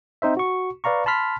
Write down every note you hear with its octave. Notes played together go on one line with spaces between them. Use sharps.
C4 D#4 C5 E5
F#4 C#6
B4 D5 F5 A#5 C#6
A5 B5 C6 F6 B6